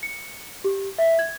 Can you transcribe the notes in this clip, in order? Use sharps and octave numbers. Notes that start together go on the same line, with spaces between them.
C#7
G4
E5
G#6